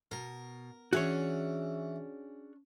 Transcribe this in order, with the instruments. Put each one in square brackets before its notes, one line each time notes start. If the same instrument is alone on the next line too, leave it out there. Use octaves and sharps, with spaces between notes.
[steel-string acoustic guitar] B2 [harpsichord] A#4
[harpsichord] E3 [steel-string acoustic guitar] C#4 D4 [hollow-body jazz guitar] F#4 G#4 C#5